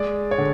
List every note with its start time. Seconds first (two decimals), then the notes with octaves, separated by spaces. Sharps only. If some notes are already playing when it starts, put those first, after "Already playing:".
Already playing: G#3 D5
0.31 C#5
0.38 D3